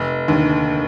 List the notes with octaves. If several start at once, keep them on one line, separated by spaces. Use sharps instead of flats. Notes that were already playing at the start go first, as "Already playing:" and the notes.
Already playing: F1
D#2 D3